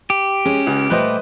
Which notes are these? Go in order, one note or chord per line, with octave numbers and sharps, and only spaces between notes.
G4
G#3 C#4
C#2
A#2 G3 A3 B4 C5 D#5